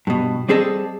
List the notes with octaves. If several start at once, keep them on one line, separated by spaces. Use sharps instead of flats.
G2 B2
G3 C4 G#4 A4 D#5